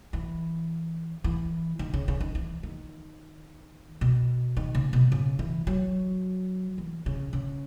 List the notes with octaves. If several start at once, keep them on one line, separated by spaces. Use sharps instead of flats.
E3
E3
D#3
C#3
C#3
D#3
E3
D#3
B2
D#3
C#3
B2
C#3
E3
F#3
E3
C#3
C#3